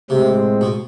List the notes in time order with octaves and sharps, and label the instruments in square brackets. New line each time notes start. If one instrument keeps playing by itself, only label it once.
[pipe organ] A2 G#3 C4 [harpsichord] C3
[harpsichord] B2